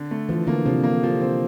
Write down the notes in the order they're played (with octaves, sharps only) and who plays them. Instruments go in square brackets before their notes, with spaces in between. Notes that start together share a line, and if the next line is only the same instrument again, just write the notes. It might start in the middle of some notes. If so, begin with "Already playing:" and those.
Already playing: [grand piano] D3
A3
[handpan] E3 [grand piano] F3
[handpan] D3 [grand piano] A#3
[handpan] C3 [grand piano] F3
[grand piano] A#3
F3
C4